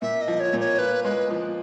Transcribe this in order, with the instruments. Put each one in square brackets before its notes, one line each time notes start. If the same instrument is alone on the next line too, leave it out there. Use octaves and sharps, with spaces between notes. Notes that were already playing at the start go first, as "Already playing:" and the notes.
[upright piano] A#2 [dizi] E5
[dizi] D#5
[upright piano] F3
[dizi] C#5
[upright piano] A#2
[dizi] C#5
[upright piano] F4 [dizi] B4
[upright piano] G#3 [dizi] B4
[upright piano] F3